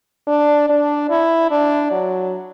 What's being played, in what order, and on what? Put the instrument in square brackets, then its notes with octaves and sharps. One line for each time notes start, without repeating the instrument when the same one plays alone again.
[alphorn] D4
D4
E4
D4
F#3